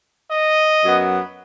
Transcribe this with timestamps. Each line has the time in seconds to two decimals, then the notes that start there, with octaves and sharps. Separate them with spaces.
0.31 D#5
0.84 F#2 F#3 B3